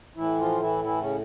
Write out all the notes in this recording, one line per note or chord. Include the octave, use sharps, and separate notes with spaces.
A2 E3 E4
F3 F4
E3 E4
E3 E4
C#3 C#4